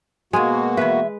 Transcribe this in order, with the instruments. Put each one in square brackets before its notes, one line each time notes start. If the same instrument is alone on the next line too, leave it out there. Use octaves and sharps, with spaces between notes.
[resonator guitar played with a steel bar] G#2 G#5 [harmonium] B2 A#3 F#4 [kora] G#3
[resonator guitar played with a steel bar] E3 E5 [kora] B4